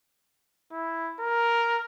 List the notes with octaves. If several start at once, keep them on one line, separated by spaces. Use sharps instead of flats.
E4
A#4